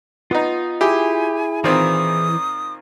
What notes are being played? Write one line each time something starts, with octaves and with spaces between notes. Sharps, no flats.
B3 D#4 F4 D#6
E4 G4 G#4 G#5
A#2 D#3 E3 C4 D#6